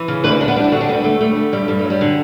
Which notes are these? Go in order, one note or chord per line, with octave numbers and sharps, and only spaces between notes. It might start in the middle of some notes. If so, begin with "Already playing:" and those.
Already playing: E3
C#3
D2 B4
E4
D2 D4
B3
G3 D4
E4
D3 F#4
D4
D2 B3
D2 A3
G3 A3
D3
G2 G3
G2 G3
A3
F#3
G3
D3